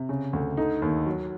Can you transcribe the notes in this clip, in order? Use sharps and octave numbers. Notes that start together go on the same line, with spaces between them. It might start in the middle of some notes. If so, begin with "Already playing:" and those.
Already playing: C3
C#3
D2
D3 D#4
D#2
F#3